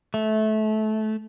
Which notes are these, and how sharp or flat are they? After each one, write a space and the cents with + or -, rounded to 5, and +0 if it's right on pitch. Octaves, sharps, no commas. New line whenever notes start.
A3 -20